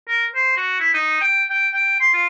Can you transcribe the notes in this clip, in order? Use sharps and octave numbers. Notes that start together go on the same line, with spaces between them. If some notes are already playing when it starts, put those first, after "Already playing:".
A#4
C5
F#4
E4
D#4
G5
G5
G5
C6
F4